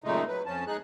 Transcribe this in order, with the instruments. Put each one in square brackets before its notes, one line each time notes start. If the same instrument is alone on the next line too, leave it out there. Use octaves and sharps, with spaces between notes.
[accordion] F#2 A#2 C#3 G#3 A3 D#4
F#3 B4
F2 F3 C#4 A5
G#3 D#4 G#4 F#6